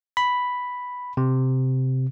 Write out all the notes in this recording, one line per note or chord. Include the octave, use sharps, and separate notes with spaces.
B5
C3